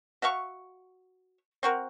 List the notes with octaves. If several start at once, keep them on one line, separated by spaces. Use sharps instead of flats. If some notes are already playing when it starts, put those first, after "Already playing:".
F#4 E5 F5 C#6
C4 F#4 A#4